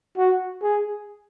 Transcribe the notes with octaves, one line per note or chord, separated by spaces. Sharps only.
F#4
G#4